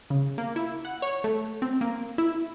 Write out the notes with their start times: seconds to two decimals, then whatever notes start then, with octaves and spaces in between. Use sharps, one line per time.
0.10 C#3
0.38 A#3
0.56 E4
0.85 F#5
1.02 C#5
1.24 A3
1.62 C4
1.81 A#3
2.18 E4